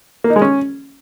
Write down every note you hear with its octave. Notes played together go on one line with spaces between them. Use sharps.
A#3
D#4
G#3
C#4